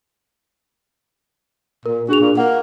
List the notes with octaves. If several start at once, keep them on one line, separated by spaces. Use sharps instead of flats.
A#2 A#4
D4 F#4 G#4 F7
A#2
A#3 F#5